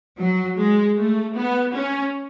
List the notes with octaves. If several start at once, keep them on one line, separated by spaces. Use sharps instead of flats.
F#3
G#3
A3
B3
C#4